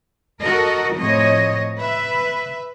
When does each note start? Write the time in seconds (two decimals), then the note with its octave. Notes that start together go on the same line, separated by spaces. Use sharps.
0.41 F#4 A4 A#4 D#5
0.98 A2 F3 C4 C#5 D#5
1.78 B4 E5